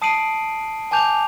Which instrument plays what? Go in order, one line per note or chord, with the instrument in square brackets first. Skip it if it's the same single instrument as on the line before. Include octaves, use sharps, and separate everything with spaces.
[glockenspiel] A5 D#6 C7 D7 D#7 F#7
G#5 A5 D6 G6 F7